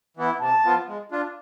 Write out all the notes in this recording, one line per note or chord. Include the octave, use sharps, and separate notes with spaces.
E3 B3 E4
C3 A5
F3 B3 F4
G#3
D4 F4